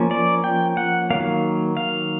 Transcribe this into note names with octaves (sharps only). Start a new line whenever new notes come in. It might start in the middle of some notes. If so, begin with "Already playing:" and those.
Already playing: F3 A#3 C#4
D5
G5
F#5
D#3 F#3 A#3 F5
F5